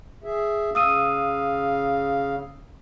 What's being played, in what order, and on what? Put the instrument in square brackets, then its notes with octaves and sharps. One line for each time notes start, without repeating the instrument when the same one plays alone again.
[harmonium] G#4 E5
[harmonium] C#3 F5 [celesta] D#6 E6 D#7